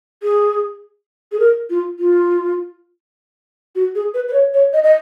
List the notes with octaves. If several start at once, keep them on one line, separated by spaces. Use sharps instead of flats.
G#4
G#4
A#4
F4
F4
F#4
G#4
B4
B4
C#5
C#5
D#5
D#5